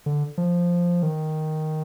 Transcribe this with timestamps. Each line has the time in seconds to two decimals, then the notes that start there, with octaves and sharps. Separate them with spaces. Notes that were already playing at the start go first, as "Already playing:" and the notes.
0.06 D3
0.38 F3
1.02 D#3